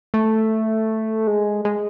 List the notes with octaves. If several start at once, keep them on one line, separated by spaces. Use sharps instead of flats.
A3
G#3
G#3